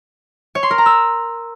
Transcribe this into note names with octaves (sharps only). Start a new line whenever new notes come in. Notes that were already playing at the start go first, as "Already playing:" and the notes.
C#5
C6
A#4
A#5
E6